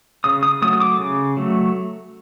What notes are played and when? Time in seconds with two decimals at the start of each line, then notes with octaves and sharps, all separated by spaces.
0.24 C#3 D#6
0.43 D#6
0.62 F#3 A3 D#6
0.73 D#6
0.80 D6
0.99 C#3
1.37 F#3 A3